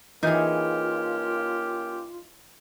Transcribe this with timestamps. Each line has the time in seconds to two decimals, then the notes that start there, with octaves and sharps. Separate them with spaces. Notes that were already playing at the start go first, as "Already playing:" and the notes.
0.23 E3 A#3 C#4 D#4 F4 G4 G#4